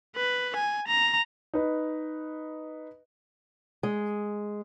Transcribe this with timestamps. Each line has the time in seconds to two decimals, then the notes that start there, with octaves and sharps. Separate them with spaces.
0.16 B4
0.56 G#5
0.88 A#5
1.54 D#4 B4
3.83 G#3